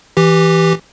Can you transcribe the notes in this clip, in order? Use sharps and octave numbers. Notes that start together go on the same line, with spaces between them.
E3 G4